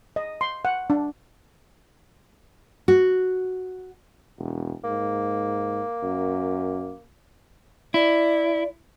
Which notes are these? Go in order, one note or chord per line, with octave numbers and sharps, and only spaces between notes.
D#5
C6
F#5
D4
F#4
E1
G#2 A#3
F#2
E4 D5